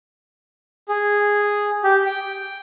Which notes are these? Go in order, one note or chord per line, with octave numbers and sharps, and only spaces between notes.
G#4
G4
G5